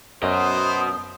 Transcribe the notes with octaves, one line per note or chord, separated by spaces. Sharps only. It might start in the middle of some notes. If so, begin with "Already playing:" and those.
F#2 B2 C5 D#5 D#6